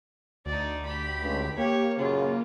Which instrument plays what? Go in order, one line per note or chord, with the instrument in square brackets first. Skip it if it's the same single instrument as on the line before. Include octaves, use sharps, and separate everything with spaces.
[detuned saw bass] D2 [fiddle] D#4 D5
[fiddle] G4 B5
[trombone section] C#2
[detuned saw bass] A#3 [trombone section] G4 [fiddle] C#5
[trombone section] F#2 A#2 C#3 [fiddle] F4